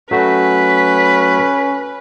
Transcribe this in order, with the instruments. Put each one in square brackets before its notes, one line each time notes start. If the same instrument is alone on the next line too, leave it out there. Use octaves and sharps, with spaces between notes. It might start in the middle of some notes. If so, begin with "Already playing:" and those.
[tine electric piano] F#3 A3 F#4 [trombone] C#4 [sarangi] B4 [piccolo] B6